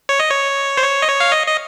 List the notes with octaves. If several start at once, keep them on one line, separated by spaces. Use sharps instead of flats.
C#5
D#5
C#5
C5
C#5
D#5
C#5
F5
D#5
D#5